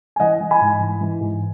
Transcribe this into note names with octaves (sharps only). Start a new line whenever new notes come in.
G#5
E3 D#5 F#5
E3
G#5 B5
G#2
E3
E3
G#2